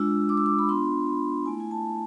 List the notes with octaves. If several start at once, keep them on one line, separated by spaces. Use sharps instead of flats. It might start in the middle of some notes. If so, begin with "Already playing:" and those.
Already playing: G#3 D4 F4 E6
D6
E6
D6
B5
B3 D4 F4 C6
B5
A3 E4 G#5
G#5
A5